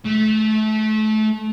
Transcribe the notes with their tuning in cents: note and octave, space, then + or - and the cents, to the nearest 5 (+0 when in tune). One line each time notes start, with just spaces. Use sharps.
A3 -25